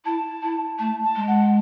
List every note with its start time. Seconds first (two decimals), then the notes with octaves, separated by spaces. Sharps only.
0.05 E4 A5
0.43 E4
0.79 A3 A5
1.04 A5
1.16 G#3
1.28 F#5